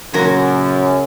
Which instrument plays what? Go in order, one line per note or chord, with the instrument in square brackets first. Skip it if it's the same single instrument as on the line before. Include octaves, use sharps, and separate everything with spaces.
[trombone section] F#2 [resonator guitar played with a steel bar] A#2 F#3 A#4 [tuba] C#3